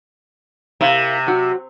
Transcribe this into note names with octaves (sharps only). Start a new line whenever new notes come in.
C3 A#3 E4 F5
F#3 F#4